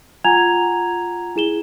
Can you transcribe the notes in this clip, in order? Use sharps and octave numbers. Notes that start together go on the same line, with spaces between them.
F4 F#5 G#5 A#5 G#6 F7
E4 G#4 E7 G7